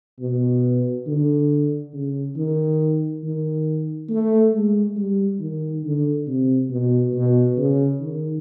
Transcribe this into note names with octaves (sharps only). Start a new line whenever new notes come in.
B2
D3
C#3
D#3
D#3
A3
G#3
G3
D#3
D3
C3
B2
B2
C#3
D#3